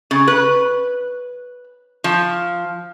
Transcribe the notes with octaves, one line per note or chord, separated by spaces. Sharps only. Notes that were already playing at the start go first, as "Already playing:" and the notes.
C#3
B4
F3